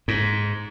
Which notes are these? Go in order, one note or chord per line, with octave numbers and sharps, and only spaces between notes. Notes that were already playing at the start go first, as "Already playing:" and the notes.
G#2